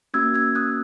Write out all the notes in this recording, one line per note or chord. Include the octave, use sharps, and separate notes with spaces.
A#3 C#4 F#4 E6 G#6
E6 G#6
D#6 F#6